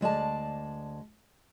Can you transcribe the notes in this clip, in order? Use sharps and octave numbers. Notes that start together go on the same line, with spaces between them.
D2 G#3 D5 A5